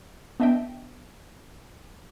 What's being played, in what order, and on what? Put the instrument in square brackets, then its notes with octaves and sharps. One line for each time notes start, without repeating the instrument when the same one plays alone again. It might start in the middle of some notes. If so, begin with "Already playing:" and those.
[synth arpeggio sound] B3 D4 D#5 E5 G5